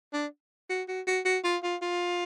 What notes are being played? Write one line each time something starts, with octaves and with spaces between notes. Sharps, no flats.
D4
F#4
F#4
F#4
F#4
F4
F4
F4